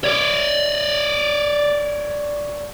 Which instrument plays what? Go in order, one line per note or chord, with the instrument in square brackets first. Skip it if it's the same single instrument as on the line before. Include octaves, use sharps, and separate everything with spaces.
[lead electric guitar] C#5 D5